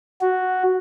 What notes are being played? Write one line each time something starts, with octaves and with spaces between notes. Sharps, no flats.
F#4